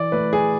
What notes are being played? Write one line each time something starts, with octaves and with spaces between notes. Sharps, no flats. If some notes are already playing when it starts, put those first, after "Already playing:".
Already playing: E3 D5
A3 B4
G#4